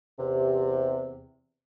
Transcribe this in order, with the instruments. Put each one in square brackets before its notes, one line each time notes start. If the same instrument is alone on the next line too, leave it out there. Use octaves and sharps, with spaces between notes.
[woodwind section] E2 C3